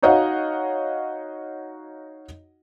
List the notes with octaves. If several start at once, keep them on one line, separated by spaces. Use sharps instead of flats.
D#4 F#4 C#5 D#5 F5 F#5